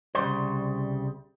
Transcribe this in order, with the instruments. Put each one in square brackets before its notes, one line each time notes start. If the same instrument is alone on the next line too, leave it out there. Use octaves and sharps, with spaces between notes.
[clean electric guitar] C2 C#3 F3 G3 C5